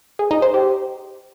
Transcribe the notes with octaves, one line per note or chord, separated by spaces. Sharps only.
G#4
D#4
C5
G4